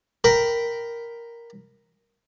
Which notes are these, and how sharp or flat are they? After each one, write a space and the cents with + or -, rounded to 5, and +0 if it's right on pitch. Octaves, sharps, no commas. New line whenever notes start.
A#4 +0 G5 -10 B5 +5